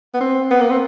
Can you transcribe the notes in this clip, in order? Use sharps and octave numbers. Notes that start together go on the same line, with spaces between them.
B3
C4
B3
A#3
C4